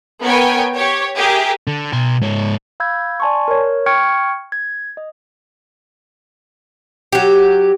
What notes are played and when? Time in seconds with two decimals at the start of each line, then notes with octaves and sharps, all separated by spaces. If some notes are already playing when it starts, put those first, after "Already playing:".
0.24 B3 A#4 C#5 G5 G#5
0.76 G4 C#5
1.18 G4 G#4 A#4 E5
1.67 D3
1.93 B2 C6
2.21 G#2 C#5
2.80 F5 B5 E6 G6 G#6
3.20 D5 G#5 A5 C6 C#6
3.48 A#4 C#5
3.86 G5 C#6 F6 G#6 C#7 D7
4.52 G#6
4.97 D#5
7.12 F#3 G4